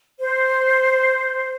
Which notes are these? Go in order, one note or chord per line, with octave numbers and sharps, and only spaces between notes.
C5